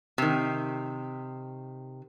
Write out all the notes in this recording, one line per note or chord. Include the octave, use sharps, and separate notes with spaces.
C3 D#3